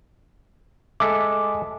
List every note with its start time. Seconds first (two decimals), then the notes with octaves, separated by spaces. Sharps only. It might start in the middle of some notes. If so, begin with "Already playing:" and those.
1.00 G#3 A4 E5 D6